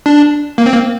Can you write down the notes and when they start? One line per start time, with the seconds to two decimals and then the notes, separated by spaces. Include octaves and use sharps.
0.06 D4
0.58 A#3
0.66 C4
0.74 A#3